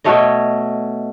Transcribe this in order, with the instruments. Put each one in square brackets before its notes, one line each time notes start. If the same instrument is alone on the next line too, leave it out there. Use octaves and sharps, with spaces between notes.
[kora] B2 A3 C#5 D#5